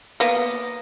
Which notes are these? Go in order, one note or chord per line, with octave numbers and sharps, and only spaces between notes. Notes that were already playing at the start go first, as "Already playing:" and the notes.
A#3 B3